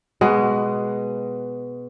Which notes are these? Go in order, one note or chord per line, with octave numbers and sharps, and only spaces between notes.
B2 G#3 B3